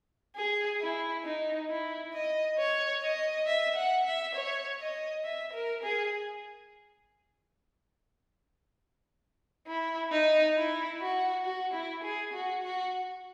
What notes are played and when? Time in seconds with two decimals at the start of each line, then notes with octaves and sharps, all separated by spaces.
0.36 G#4
0.81 E4
1.24 D#4
1.69 E4
2.14 D#5
2.58 C#5
3.02 D#5
3.47 E5
3.76 F#5
4.06 E5
4.35 C#5
4.80 D#5
5.24 E5
5.53 A#4
5.83 G#4
9.67 E4
10.11 D#4
10.56 E4
11.00 F#4
11.45 F#4
11.73 E4
12.03 G#4
12.33 F#4
12.63 F#4